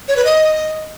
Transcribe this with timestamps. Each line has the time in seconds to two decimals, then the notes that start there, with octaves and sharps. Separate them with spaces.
0.08 C#5
0.17 B4
0.25 D#5